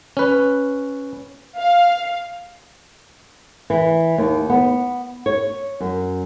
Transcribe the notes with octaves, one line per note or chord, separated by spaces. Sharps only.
C#4 B4
F5
E3
D#2
B3
C#5
F#2